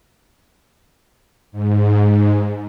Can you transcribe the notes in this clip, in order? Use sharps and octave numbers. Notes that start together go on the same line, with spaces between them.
G#2